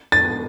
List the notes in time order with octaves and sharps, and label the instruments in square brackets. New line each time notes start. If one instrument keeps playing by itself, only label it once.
[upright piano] A6